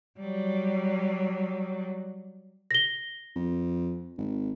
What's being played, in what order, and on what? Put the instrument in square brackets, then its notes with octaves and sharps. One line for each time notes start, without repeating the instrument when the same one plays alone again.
[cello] F#3 G3
[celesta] A#6 G7
[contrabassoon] F2
G#1